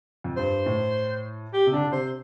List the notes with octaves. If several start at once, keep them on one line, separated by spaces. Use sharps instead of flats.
F2
G2 C5
A2
G4
C3
D3 D4
D3
C3 C5